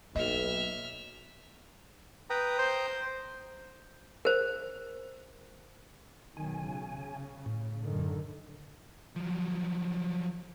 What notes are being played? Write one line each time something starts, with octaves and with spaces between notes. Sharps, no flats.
B1 A#3 D#5 E5 F6
B4 G5 A#5 D#6
C5
A#4 C5
B1 D#3 G#5
C#3
A2
F#2 D3 D#3
F3 F#3